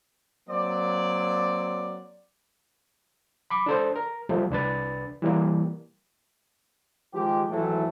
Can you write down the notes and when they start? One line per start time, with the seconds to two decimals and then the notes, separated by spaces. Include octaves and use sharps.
0.48 F#3 A#3 C4 D5
3.50 B5 D6
3.66 D4 A4 C5
3.96 A#4
4.29 F3 G3 A3
4.50 C2 D4 B4 A6
5.22 E3 G3 A#3
7.14 D#3 F3 G#3 G4
7.51 G#1 A2 E3 F#3 A3 A4